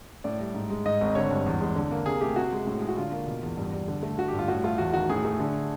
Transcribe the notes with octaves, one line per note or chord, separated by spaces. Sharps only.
A2 D5
G3
G#2
G#3
G#2 D#5
G#1
D3 C#5
G2
E2
G#3
D3
A#3
C3 G#4
A3 G4
C3 F#4
G#3
A2
G#3
F#4
D3 F4
A#3
B2
E2
G2
G3
D3
A3
D3 F#4
G4
G2
F4
A2 F#4
A3 F4
E2 F#4
D#3 F#4
A2 G#4
A3
D3